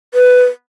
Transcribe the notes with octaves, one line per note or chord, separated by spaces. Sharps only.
B4